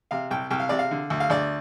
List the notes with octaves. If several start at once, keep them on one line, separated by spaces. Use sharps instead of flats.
C3 F5
C2 G5
C2 G5
F5
C3 D5
F5
D3
D2
F5
D2 D5